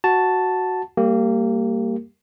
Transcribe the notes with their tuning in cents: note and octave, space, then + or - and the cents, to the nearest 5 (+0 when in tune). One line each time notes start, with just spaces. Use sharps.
F#4 +0 A5 +0
G3 +0 A#3 -25 G4 +0